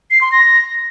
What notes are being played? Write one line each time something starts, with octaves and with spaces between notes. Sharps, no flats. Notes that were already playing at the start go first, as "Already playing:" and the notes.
C7
C6
A#6